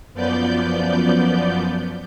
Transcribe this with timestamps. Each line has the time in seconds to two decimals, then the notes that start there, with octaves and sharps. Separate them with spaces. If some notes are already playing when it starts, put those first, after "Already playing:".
0.14 F#2 F3 B3 D5 G6